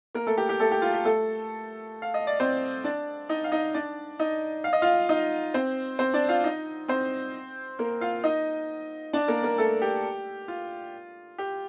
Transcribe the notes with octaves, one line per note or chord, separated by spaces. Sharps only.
A#3 A#4
A3 A4
G4
G4
A3 A4
G4
F4
G4
A3 A4
F5
D#5
D5
C4 C5
D4 D5
D#4 D#5
F5
D#4 D#5
D4 D5
D#4 D#5
F5
D#5
F4 F5
D#4 D#5
C4 C5
C4 C5
D4 D5
F4 F5
D#4 D#5
C4 C5
A#3 A#4
F4 F5
D#4 D#5
D4 D5
A#3 A#4
A#3 A#4
A3 A4
G4
F4
G4